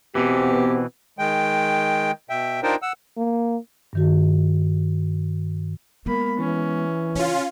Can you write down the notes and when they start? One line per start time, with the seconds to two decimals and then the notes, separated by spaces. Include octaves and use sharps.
0.15 B2 E3 B3 C4 G4
1.19 D#3 G#3 G5
2.30 B2 E5 G5
2.63 D4 D#4 F4 A#4 C5 G5
2.82 F#5 E6
3.17 A#3
3.93 G2 D#3 F#4
6.06 G#3 A#3 B3 B5
6.39 E3 C#4
7.15 C#3 C#4 F4